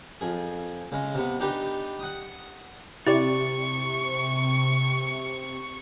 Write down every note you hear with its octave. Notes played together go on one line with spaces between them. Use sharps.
F2 G#4
C#3 G#3
C3 B3
D4 D#4 G4 B4
F#5 D#6
C3 E4 G4 D5 C#6